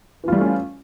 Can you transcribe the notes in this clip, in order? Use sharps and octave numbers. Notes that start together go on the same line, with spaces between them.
E3 G3 A3 C#4 F4